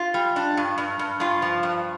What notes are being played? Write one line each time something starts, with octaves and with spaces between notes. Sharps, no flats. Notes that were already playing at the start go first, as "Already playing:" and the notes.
Already playing: F4
G3
D4
G2
G2
G2
G2 F4
F3
G2